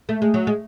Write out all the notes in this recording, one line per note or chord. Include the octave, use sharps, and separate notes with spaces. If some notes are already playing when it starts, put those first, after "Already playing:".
A3
G#3
F#3
G#3